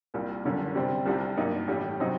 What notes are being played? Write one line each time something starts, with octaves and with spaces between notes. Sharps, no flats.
C2 A#2 G3
F#1 F#2 D3 G3
C3 G3 C4
C2 C3 G3 D4 G4
G2 F#3 A#3 D#4
A1 A2 G3 D4 G4
C3 F#3 C4 D#4